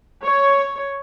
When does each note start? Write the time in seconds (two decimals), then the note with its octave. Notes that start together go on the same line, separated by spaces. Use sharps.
0.24 C#5